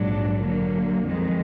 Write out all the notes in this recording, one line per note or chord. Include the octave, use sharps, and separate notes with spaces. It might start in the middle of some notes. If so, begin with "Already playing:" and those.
Already playing: A#1 G#2 F#3 D4
D3 F#3 A#3
F2 D#3 G#3